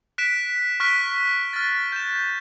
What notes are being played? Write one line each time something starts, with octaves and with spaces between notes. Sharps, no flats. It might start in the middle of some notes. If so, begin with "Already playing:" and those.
F#6 B6 D7 E7
C#6 F6 F#6 B6 D7
F6 A6
G6 E7